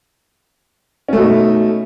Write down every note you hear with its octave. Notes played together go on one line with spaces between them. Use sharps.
B2 A3 C#4 D#4